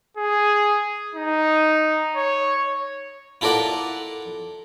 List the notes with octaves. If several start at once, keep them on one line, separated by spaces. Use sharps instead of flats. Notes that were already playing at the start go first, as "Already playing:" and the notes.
G#4
D#4
C#5
E4 F4 A4 A#4 D5 F#5